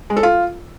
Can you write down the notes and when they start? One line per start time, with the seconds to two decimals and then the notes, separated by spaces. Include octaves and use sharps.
0.10 G#3
0.17 A4
0.23 F4